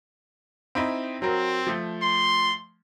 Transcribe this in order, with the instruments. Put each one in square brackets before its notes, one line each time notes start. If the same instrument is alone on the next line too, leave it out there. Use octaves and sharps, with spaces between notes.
[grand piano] C4 D#4 E4
[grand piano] F#3 A#4 [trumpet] C4
[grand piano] F3 A3
[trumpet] C6